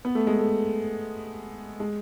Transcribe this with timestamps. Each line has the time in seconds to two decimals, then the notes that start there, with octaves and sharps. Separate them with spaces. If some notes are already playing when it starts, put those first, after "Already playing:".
0.05 B3
0.15 A3
0.27 G#3
0.39 A3
1.80 G#3